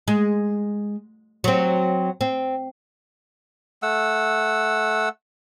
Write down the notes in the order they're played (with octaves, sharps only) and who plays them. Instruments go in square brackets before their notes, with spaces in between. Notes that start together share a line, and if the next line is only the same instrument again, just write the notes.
[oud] G#3
F#3 C4
C4
[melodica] A3 F#5 E6